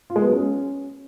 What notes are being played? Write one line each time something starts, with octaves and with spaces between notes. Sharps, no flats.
F4
G#3
B3
F#3
C#4